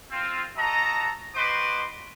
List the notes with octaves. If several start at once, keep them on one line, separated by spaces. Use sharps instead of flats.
C4 F4
F#4 A4 D#5 A5 A#5
F#4 B4 C5 D#5 C6 D6